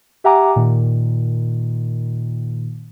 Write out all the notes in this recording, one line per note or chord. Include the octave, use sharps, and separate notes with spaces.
G4 E5 F#5 G#5 A#5 D6
A#2 D#3